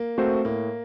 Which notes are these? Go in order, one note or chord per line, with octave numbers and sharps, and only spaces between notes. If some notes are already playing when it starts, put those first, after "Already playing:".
Already playing: A#3
A3 C4 F#4 C5
A2 A#3